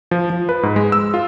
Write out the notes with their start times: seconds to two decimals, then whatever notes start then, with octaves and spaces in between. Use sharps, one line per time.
0.11 F3
0.30 F3
0.49 B4
0.63 G#2
0.76 G#3
0.92 E6
1.14 F4